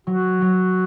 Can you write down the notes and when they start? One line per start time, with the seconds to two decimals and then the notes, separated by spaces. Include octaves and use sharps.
0.07 F#3 F#4
0.42 F#3